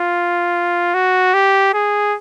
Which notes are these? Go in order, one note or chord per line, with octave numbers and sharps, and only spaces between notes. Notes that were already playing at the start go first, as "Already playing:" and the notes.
Already playing: F4
F#4
G4
G#4